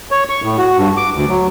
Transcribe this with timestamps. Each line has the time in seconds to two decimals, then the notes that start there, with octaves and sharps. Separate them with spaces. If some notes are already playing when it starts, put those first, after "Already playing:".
0.11 C#5
0.29 C#6
0.43 A2
0.58 F#4
0.78 G2
0.97 D6
1.14 D2
1.28 F#3